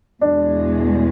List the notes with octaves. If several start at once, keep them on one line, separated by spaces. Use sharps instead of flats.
E2 B2 G#3 D4